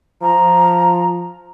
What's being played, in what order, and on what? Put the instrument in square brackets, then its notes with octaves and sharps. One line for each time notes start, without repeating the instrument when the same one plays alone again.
[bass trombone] F3 [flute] A#5